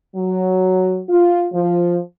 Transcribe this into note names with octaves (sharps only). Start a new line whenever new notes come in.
F#3
F4
F3